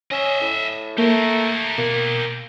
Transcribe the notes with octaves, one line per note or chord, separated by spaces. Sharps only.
C#4 D#5 E5
A2
A3 A#3 G4 A#4
B2 A#3